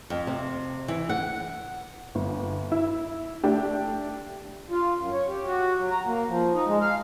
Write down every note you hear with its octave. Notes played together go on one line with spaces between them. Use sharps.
F2
C3
E3
F#5
G1
E4
A3 D4 G4
F4
F#2
C#5
G4
F#4
F#3
A#5
A#3
F3
D#4
G#3
F5